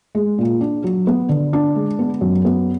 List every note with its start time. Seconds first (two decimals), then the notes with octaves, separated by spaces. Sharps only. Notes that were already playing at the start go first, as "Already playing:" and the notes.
0.15 G#3
0.38 A#2
0.61 D4
0.84 F#3
1.07 B3
1.29 D3
1.53 D4
1.75 G#3
1.99 B3
2.21 F#2
2.45 B3